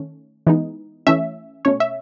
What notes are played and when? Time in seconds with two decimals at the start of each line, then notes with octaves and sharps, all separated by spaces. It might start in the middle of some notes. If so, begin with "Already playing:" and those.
Already playing: D#3 A3 C#4
0.47 E3 G#3 B3 D#4
1.07 E3 A3 C#4 E5
1.65 B2 A3 C#4 C#5
1.80 E5